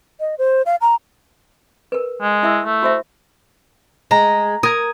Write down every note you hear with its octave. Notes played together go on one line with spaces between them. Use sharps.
D#5
C5
F5
A#5
A#4 B4
G#3
E4 E5 E6
A3
F#4 C5 E5
G#3 A#5
A#4 D#6 G#6